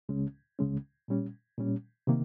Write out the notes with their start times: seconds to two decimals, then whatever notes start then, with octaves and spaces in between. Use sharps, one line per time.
0.09 C#2 C#3 G#3 C#4
0.59 C#2 C#3 G#3 C#4
1.08 A#2 G3 C#4
1.58 A#2 G3 C#4
2.07 C3 D#3 A#3